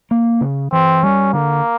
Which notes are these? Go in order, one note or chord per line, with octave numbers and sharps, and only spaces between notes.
A#3
C#3
E3 C4
G3 C#4
D3 A#3